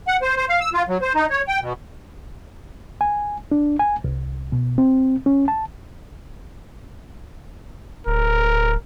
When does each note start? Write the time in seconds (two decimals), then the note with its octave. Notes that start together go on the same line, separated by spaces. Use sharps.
0.08 F#5
0.22 C5
0.37 C5
0.49 F5
0.60 E6
0.73 F4
0.88 F#3
1.01 C5
1.15 D#4
1.30 C#5
1.48 G5
1.61 B2
3.01 G#5
3.52 D4
3.79 G#5
4.04 C2
4.52 B2
4.78 C4
5.26 C#4
5.48 A5
8.07 D1 A#4